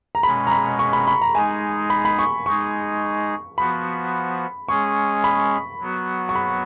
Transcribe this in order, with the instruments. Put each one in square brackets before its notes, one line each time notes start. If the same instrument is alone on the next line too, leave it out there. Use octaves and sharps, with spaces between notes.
[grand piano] A#5
[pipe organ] B2 G#3 C#4 [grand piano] B5
[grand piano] A#5
B5
C#6
B5
B5
A#5
[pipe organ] G#3 D#4 G#4 [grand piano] G#5
[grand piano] B5
B5
C#6
[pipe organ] G#3 D#4 G#4 [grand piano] C#6
[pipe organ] F3 B3 F#4 [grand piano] B5
[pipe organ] G#3 C#4 G#4 [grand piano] C#6
[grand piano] B5
[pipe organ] F#3 B3 F#4
[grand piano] C#6
B5